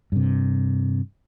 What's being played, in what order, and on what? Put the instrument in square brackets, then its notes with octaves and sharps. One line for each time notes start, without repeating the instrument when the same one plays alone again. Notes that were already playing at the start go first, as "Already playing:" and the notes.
[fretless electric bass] G2 C3